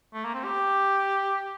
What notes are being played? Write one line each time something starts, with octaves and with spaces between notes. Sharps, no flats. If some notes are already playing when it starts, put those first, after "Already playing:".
A3
A#3
C4
G4